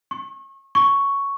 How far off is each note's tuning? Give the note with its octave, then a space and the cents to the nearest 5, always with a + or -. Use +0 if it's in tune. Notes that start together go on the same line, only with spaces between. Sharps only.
C#6 -35
C#6 +5